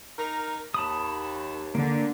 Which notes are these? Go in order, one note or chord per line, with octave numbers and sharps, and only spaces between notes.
D#4 A#4
D#2 A5 B5 D#6
D3 A#3